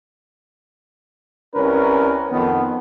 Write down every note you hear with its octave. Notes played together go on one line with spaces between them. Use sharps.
C2 C#4 A#4 B4
F2 D#3 B3